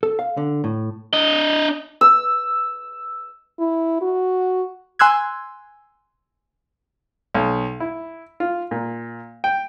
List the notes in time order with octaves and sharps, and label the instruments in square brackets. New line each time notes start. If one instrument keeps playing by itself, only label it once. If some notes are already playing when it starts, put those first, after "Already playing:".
[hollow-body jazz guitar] A4
F5
D3
A2
[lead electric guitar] D4 D#5
[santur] E6
[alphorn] E4
F#4
[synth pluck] G#5 C6 E6 F#6 G#6
[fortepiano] B1
E4
F4
A#2
G5